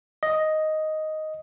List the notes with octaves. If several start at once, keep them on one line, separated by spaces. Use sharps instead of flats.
D#5